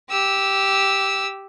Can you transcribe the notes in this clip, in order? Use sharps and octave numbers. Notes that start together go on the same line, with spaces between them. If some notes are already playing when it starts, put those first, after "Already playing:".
G4 E6